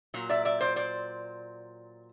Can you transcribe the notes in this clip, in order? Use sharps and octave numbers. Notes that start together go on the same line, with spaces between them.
A#2 F#3
D5 E5
D5 E5
C5 D5
C5 D5